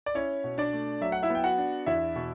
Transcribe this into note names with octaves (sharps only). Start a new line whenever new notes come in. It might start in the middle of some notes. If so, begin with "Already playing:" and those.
D5
C#4 E4 C#5
B2
D4 D5
A3
F#3 E5
F#5
E4 E5
B3
G5
F#4 F#5
D4
E2 E4 E5
B2